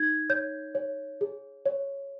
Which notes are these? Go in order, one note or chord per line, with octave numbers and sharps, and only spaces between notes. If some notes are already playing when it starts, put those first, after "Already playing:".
Already playing: D#4 G#6
C#5 G6
C#5
G#4
C#5